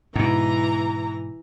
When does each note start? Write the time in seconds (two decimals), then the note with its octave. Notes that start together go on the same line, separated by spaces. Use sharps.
0.16 G#2 B2 E3 A#5